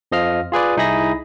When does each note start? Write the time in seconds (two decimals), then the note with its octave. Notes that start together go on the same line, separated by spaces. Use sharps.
0.12 F2 F3 D#5 F5 F6
0.52 F4 G#4 B4 D5
0.77 C2 D#4 E4 G#4 B5 A#6